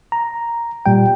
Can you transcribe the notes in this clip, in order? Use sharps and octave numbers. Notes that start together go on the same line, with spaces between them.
A#5
A#2 G3 G5